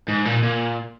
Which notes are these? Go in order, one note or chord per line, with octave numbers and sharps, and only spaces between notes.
G#2
A#2
A#2